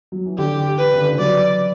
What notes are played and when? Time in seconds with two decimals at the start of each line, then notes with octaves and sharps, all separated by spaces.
0.12 F#3
0.26 E3
0.38 D3 G4
0.78 B4
0.94 C#3
1.01 D3
1.10 E3
1.18 F#3 D5